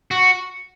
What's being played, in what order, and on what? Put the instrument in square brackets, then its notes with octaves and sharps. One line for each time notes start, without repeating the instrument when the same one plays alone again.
[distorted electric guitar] F#4